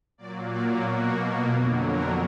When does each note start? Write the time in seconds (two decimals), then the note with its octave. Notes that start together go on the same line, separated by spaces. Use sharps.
0.18 A#2 F#3 A#3 D5
0.51 D5
0.83 B2 A#3 F#4
1.51 F2 D3 F#3
1.83 A#4